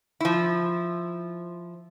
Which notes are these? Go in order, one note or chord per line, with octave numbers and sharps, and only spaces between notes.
F3 E4